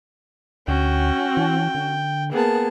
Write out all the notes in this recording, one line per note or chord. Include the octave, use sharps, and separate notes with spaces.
D2 C#4 F#4 G5
E3
D3
A#3 B3 G#4 A5